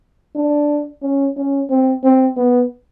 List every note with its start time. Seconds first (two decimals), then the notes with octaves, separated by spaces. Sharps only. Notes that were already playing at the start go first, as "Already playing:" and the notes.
0.36 D4
1.02 C#4
1.37 C#4
1.70 C4
2.04 C4
2.37 B3